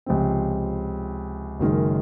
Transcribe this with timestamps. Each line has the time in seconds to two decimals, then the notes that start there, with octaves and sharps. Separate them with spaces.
0.06 C#2 C3 F3 C4
1.60 F#1 F#2 D#3 G#3